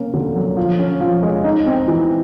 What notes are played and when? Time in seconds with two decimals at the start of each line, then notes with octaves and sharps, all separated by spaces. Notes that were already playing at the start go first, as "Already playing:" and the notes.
Already playing: C3 A#3 C#4
0.14 D3
0.35 F#3
0.57 F3
0.79 C#4
1.00 F3
1.23 G#3
1.44 D#4
1.66 C4
1.88 E3